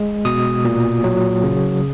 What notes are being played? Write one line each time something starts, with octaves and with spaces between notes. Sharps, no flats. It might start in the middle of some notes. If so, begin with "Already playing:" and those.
Already playing: G#3
B2 D#6
A#2
F#3
C#3